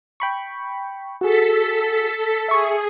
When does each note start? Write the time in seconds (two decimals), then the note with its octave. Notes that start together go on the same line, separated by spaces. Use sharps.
0.20 G5 B5 C#6
1.21 F#4 G#4 A4 B6
2.48 G#4 E5 C#6